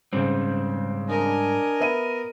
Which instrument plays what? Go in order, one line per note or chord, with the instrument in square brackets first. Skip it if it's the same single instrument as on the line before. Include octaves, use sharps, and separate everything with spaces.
[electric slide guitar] G#2 G3 [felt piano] C#3 C4
[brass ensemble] D4 G#5 [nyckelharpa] A#4 D#5
[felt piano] B3 E5 D#7